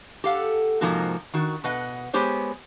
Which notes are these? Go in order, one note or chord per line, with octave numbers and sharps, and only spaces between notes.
G4 A4 F5 F#5
G#2 C3 F3 A#3 D#4 F#4
D#3 F#4
B2 B4 D#5 F#5
G#3 B3 G4 C5 C#5